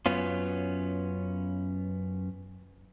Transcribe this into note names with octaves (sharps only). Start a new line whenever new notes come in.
F#2 B3 C#4 F4